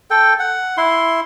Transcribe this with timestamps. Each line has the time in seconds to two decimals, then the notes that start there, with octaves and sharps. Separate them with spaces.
0.10 A4 G5
0.39 F#5
0.77 E4 C6